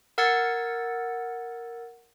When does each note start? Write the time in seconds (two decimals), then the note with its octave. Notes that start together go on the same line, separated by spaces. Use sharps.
0.18 A#4 F#5 E6 G#6 A6 C#7